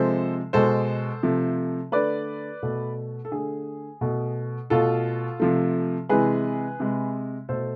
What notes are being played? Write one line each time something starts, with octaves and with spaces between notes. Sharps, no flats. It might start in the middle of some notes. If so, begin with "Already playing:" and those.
Already playing: C3 F3 G#3 A4 C5
B2 G#3 A4 C5
C3 F3 A3
D3 A3 B4 D5
B2 A3
A4
D3 A3 G#4
B2 A3
B2 A3 F4 A4
C3 F3 A3
C3 E3 G#3 G#4 B4
C3 G#3
B2 A3 A4 C5